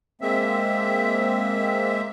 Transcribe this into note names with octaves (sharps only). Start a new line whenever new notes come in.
G#3 A#3 C4 E5